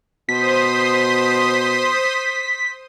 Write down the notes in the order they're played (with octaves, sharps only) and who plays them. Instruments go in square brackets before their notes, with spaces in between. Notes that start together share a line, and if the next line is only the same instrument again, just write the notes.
[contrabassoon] B2 [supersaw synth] C5 C6 D#6 [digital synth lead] B6